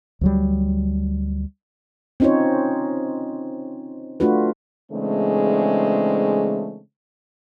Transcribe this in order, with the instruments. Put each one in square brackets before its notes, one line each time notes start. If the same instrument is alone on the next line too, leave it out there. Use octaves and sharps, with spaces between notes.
[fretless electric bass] D2 F#3 G3
[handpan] C4 C#4 D#4 F4 C5 C#5
A3 D4 F4 F#4 B4
[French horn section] C#3 E3 G#3 A3 C4 D4